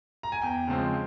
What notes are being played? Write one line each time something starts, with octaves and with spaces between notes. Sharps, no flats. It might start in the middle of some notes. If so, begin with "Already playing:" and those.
A#5
G#5
E2 G5
C#3 F3 G#3 C4